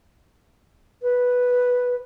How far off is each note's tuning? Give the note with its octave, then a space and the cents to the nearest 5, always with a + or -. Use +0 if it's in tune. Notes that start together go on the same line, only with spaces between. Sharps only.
B4 -5